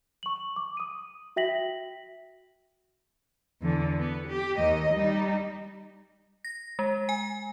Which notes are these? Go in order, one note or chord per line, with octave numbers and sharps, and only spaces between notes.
C#6 F#7
D6
D#6 D#7
F#4 E5 G5 A#6 B6 F#7
E2 D3
B3
G4
D#2 D#5
G3 D#4
A#6
G#3
G#5